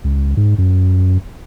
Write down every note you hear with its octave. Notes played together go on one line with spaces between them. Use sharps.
C#2
G#2
F#2